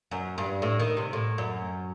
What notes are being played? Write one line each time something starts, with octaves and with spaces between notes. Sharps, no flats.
F#2
G2
A2
D#3
C3
A2
F#2